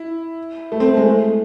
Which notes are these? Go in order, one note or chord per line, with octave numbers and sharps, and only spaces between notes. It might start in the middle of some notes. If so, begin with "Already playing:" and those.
Already playing: E4
A3
C4
A3
G#3
A3